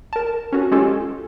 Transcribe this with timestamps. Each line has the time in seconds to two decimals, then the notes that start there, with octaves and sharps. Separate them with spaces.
0.13 A#4 A5
0.53 C#4 F#4 A4
0.72 G#3 C#4 F4 G4 A4